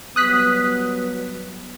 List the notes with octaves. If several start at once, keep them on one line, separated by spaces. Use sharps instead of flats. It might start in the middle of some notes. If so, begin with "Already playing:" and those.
F#3 G3 B3 D#6 F#6 B6